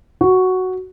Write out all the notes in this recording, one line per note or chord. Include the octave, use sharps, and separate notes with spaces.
F#4